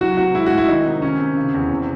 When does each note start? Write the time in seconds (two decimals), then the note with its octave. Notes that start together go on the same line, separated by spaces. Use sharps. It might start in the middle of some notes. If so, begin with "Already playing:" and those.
0.01 F#3 F#4
0.17 C3 F#4
0.35 G#3 E4
0.46 F#4
0.52 A2
0.58 E4
0.68 D#3 D#4
0.85 C3
1.02 D#3 C#4
1.19 C3
1.37 C#3
1.54 E2
1.71 C3